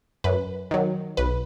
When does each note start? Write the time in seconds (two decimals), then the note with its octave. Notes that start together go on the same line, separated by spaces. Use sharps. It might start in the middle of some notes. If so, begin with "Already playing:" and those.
0.24 F#2 B4
0.71 D#3 F#3
1.17 B1 B4